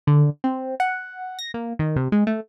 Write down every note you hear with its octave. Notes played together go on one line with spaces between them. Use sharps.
D3
C4
F#5
A#6
A#3
D#3
C3
G#3
A3